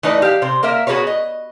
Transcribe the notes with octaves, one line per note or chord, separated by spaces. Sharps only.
E3 A3 D#4 B4 D5
G4 F5
C3 C5
A#3 A#4 E5
B3 F#4 G#4 A#4 B4 C#5
D#5